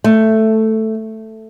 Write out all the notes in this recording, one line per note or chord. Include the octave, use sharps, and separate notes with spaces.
A3